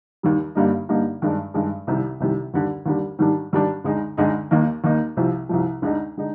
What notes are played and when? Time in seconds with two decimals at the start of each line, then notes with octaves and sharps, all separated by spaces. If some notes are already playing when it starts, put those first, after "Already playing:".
0.23 D#2 D#3 G3
0.55 G2 D3 G3 A#3 D#4
0.89 G2 D3 G3 A#3 D#4
1.22 G2 D#3 G#3 D4
1.54 G2 D#3 G#3 D4
1.87 C2 C3 D#3 G3
2.20 C2 C3 D#3 G3
2.54 D#2 D3 G3
2.86 D#2 D3 G3
3.19 G#2 D#3 G3 D4
3.53 G#2 D#3 G3 D4
3.84 D2 D3 G#3 D#4
4.17 D2 D3 G#3 D#4
4.51 D#2 D#3 A#3 D#4
4.84 D#2 D#3 A#3 D#4
5.17 C2 C3 F3
5.49 C2 C3 F3
5.82 D2 D3 G#3 D#4
6.17 D3 G#3 D#4